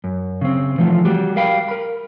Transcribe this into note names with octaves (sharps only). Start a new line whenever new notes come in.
F#2
C#3 C4
E3 F3 A3 F4
G3 F#4 G4
G3 A#4 F5 G5 B5
A#4 B5